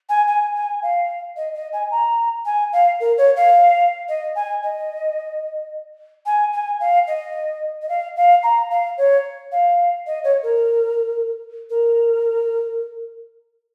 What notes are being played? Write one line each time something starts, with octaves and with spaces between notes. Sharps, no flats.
G#5
G#5
G#5
F5
D#5
D#5
G#5
A#5
G#5
F5
A#4
C#5
F5
D#5
G#5
D#5
G#5
G#5
F5
D#5
D#5
F5
F5
A#5
F5
C#5
F5
D#5
C#5
A#4
A#4